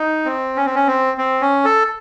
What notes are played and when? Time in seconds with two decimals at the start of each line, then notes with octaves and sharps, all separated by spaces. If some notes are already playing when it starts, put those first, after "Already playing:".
Already playing: D#4
0.25 C4
0.56 C#4
0.66 C4
0.75 C#4
0.87 C4
1.17 C4
1.41 C#4
1.65 A4